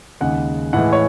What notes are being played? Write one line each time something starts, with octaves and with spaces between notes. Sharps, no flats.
D#2 C#3 G#3 F#5
A2 E3 G#3 F#5
C#5